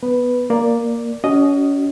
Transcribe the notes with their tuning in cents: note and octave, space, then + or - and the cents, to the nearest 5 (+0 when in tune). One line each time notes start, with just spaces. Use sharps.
B3 +0 B4 +0
A#3 +0 D5 +0
C#4 +30 F#4 +25 D#5 +0